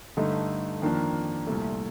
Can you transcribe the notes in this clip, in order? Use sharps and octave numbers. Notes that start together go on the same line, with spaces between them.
G2 D3 A3 D#4
F2 D#3 A#3 D4
C2 A#2 A3